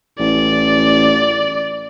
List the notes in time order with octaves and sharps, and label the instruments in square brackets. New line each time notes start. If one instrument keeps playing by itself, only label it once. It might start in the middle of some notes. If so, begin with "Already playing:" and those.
[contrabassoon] A1 [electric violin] D5